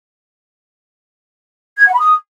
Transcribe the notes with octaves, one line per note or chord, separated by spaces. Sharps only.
G#6
F#5
B5
D#6